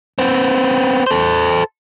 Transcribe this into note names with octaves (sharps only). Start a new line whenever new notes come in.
B3 C4
A4 C5